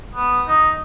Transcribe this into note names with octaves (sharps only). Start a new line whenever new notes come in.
B3
D#4